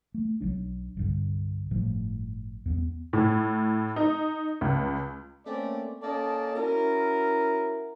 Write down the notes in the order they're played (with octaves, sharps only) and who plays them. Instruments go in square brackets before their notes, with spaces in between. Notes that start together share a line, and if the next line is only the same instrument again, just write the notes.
[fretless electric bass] A3
B1 F#3 D4
C2 G2 D3
G1 A2 F3
E2 A#3 B3
[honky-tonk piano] A2
D#4
C#2
[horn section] A3 A#3 C4 C#4 D5
A#3 C#4 A4 D5 D#5 A5
C#4 E4 F#4 A#4